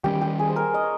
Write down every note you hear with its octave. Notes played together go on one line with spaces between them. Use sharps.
D#3 G3 C#4 G4
G4
G#4
C5
A#4
D#5
C#5